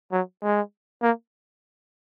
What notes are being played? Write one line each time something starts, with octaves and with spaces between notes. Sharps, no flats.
F#3
G#3
A#3